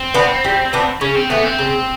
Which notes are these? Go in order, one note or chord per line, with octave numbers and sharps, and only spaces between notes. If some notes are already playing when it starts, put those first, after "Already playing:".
Already playing: C4
B3 D4
G3
B3 D4
C#3 C#4
C4
E3 A3 B3
C4
C#3